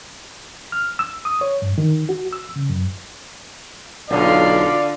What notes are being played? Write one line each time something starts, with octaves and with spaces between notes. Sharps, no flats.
F6
E6
D#6
C#5
G2
D#3
F#4
E6
C#3
F#2
B1 D3 F4 D5 F5